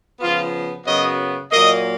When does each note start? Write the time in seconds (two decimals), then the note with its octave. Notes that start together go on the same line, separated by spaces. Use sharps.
0.20 C#3 F3 B3 F4
0.85 F#2 C#3 F#3 B3 D#5
1.51 A#2 F#3 A#3 D#5